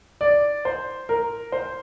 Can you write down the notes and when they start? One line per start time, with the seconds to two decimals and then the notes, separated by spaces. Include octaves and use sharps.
0.21 D5
0.65 C5
1.09 A#4
1.52 C5